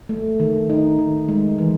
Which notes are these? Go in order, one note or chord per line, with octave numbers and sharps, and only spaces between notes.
A3
D#3
D#4
D#3
G#3
E3